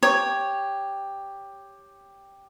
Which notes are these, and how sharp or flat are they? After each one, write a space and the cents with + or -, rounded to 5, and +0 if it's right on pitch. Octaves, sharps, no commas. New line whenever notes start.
G4 +5 C#5 +0